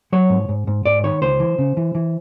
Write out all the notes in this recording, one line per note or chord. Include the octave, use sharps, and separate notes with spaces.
F#3 C#5
G#2
G#2
G#2
G#2 D5
D#3 C#5
C#2 C5
E3
C#3
E3
E3